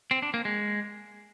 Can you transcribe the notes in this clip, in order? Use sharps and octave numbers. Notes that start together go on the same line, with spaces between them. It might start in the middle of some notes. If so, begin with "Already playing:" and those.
C4
D4
A#3
G#3